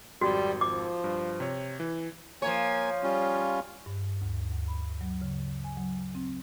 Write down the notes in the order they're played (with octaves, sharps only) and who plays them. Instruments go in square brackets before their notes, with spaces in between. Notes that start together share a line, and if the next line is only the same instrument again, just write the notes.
[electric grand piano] G#1 F2 [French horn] G3 [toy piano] F#4
[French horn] F3 [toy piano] D6
[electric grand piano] G2
C3 C#5
E3
[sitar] F3 C#5 [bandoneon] A#3 G#5
[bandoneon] G3 C#4 F4
[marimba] G2
D2
D2
B5
F#3
C#3
G#5
F#3
C4